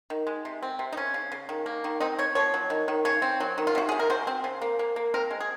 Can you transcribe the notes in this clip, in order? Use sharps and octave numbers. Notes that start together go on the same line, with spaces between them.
D#3
G#3
C3
C4
C3
D#4
C#3 C#4
C#3
C#3
D#3
A#3
D#3
C4 D#4
C4 C#5
F3 C#5
F#3
D#3
D#3
C#3 C#5
C4
F#3
D#3
F4
C3 F#4
C3 G#4
A#4
F#3 C5
C4
C#3
A#3
A#3
A#3
C4 A#4
G#3
G#4